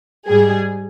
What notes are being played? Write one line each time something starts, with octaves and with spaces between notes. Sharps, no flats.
G#2 G3 G#4